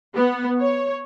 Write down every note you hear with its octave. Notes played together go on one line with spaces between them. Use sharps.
B3
C#5